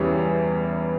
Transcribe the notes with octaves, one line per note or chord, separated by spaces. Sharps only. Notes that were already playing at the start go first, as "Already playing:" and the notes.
Already playing: E2 C#3 E3 G3 C#4